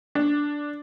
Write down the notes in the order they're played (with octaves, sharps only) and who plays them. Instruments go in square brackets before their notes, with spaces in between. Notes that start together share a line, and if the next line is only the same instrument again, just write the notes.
[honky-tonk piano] D4